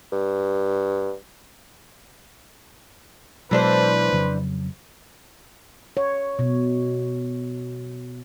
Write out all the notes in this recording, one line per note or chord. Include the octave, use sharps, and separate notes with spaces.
G2
B2 E3 F#3 G#3 D4 B4 C5
F2 C#3 F#3
C#5
B2